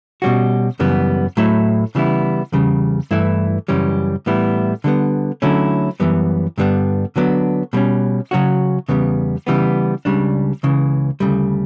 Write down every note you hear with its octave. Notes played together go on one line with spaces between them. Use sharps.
B2 G3 C#4 F#4
F#2 C#3 E3 G3 B3
A2 F#3 A3 E4
C#3 E3 G3 B3 E4
E2 C#3 G3
G2 E3 A3 E4
F#2 C#3 E3 G3 C#4
A2 E3 G3 B3 E4
D3 G3 B3
D3 F#3 A3 C#4 E4
F#2 E3 G3 B3
G2 D3 G3 B3 D4
D3 F#3 B3 D4
B2 G3 C#4
C#3 F#3 C#4 F#4
E2 C#3 G3 B3
C#3 E3 G3 B3
C#2 C#3 G3 D4
C#2 C#3 E3
D2 C#3 G3